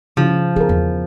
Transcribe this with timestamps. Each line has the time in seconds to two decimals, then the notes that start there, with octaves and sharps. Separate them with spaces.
0.17 C#3 F3
0.56 B3 G#4 A#4
0.69 E2